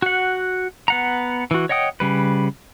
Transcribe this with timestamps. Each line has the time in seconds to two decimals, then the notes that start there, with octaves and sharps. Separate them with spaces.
0.02 F#4 F#5
0.88 B3 F#5 A#5
1.51 E3 F#4
1.69 C#5 D#5 F#5 G5 D#6
2.00 C#3 G3 B4